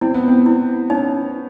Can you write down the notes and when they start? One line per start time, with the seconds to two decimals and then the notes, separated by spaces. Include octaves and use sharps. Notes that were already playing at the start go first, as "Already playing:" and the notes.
0.01 C4 E4
0.14 B3
0.28 C4
0.46 E4
0.90 C#4 D#4